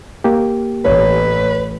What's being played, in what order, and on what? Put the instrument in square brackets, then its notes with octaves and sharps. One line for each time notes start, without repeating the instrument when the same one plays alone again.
[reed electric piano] A#3 G4
[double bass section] A1 [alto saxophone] B4 [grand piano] C#5